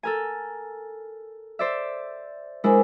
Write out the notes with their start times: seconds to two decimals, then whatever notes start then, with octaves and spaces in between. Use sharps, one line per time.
0.03 A4 A#4 G#5
1.59 C5 D5 E5
2.64 G#3 D4 E4 A#4 C5 G#5